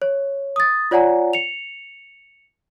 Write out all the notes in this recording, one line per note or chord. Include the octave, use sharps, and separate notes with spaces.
C#5
D#6 A6
F4 C#5 D5 F#5 G#5 A#5
C#7 F7